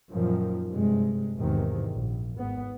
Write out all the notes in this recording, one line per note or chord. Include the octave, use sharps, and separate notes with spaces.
F#2 A#2 D#3 F3
G2 C3 G#3
G#1 E2 G#2 C3 D#3
A#1
G#1 B3